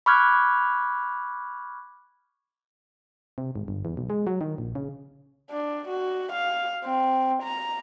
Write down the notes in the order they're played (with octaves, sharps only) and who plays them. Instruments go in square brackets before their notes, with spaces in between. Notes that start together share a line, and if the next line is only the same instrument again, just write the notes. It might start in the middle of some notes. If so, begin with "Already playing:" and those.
[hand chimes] B5 C#6 D6 F6 F#6 G#6
[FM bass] C3
G#1
G1
E2
B1
G#3
F#3
D#3
A#1
C#3
[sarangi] D4
F#4
F5
C4
A#5